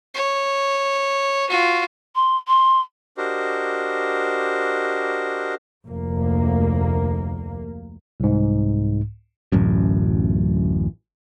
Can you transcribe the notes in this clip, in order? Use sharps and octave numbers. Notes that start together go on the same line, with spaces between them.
C#5
F4 F#4
C6
C6
D4 F#4 G4 A#4 C5 D#5
F1 D2 A#3
C2 G#2
D1 A1 F#2